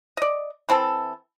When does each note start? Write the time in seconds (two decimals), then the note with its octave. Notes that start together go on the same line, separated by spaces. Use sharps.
0.17 D5 D#5
0.69 E3 C4 A4 A5